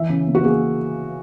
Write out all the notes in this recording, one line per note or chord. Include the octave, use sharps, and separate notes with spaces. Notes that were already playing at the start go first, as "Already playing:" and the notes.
Already playing: E3 E5
C#3
A#3
F#4
A#3 G#4